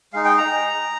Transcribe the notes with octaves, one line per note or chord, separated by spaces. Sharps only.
G#3 D#4 F5
G5
A#5